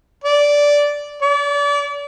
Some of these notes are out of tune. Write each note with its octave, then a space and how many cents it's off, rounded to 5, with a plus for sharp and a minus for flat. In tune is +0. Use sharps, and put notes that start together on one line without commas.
D5 -10
D5 -35